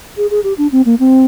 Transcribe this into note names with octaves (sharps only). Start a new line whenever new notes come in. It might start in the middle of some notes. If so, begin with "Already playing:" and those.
G#4
G#4
G4
D4
C4
A#3
C4